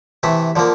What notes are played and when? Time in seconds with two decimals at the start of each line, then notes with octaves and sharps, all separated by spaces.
0.23 C3 E3 A3 E5
0.56 D3 F3 A#3